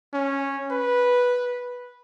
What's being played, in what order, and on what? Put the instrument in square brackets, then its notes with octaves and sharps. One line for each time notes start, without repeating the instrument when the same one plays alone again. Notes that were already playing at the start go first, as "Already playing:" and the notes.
[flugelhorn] C#4
B4